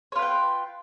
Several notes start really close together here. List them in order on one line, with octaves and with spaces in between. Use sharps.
C#5 F4 B4 G5